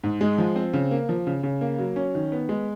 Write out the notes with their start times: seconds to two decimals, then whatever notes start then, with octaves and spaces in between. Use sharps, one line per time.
0.04 G#2
0.21 G#3
0.38 F3
0.56 C4
0.73 C#3
0.91 A#3
1.09 F3
1.27 C#3
1.43 C#3
1.61 A#3
1.78 F#3
1.96 C#4
2.15 D#3
2.32 B3
2.49 G#3